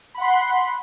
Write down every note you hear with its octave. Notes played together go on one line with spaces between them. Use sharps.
F#5 B5 C6